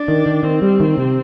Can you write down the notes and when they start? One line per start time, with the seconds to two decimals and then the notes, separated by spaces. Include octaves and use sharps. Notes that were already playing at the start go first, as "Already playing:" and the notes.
Already playing: D4
0.08 D#3
0.26 D#3
0.43 D#3 C4
0.62 G3
0.80 D#3
0.98 C3